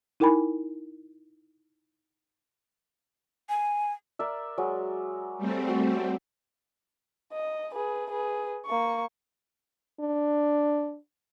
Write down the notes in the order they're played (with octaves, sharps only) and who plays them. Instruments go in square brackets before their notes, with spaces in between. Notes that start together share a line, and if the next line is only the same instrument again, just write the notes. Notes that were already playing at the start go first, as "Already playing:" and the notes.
[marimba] D#4 E4 A#4 G5 G#5 B5
[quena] G#5
[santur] A#4 D5 E5
F#3 G#3
[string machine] G3 A3 C4
[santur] F#4
[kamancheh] D#5
G#4 B4
G#4 B4
A#3 C#6
[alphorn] D4